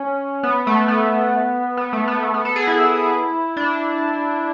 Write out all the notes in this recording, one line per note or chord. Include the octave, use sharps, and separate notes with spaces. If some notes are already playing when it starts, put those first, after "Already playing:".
Already playing: C#4
B3
A3
B3
B3
A3
B3
A3
B3
A4
G#4
E4
D4